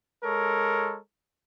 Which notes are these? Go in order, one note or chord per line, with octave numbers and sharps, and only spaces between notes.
G#3 A4 A#4 C#5